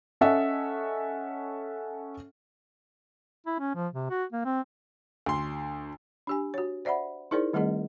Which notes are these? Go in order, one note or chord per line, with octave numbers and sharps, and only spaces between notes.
C#4 A4 D#5 E5 F#5
E4
C#4
F3
C3
F#4
A#3
C4
D2 C6
D4 G4 G#5
F#4 C#5
C5 D5 E5 F#5 B5
D#4 E4 G#4 A#4 C5 D5
D#3 G3 A3 C4 G#4 D#5